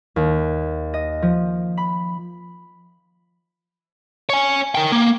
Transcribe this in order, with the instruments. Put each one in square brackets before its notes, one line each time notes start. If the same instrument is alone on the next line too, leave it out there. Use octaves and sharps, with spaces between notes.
[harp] D#2
D#5
F3
B5
[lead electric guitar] C#5 G#5
A#4 G5
A#3